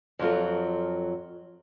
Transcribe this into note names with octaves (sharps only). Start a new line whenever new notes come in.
F2 F#3 F4 A4